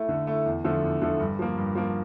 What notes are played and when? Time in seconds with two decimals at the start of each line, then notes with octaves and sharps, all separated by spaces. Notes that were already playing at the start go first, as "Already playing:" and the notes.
Already playing: A3 E4
0.09 D3
0.27 A3 E4
0.46 E2
0.64 D3 F3 A3
0.83 E2
1.02 D3 F3 A3
1.20 G2
1.39 F3 A#3
1.57 G2
1.75 F3 A#3